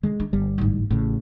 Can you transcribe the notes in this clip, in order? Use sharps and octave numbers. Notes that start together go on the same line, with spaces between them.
D3 G#3 C#4
D4
G1 G3
A1 G#2
A1 A2 C#3